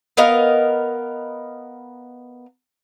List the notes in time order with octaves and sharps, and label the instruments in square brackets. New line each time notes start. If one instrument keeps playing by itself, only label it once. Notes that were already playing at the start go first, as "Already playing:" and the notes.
[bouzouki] B3 A#4 D#5 F5